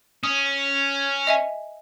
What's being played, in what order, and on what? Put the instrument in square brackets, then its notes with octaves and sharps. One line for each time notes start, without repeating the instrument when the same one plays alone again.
[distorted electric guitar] C#4 [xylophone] D#6
[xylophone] D#5 E5 G#5